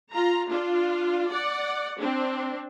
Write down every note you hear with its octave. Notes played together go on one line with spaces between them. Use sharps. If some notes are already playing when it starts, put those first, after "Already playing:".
F4 A#5
D4 F4
D5 F#5
C4 D4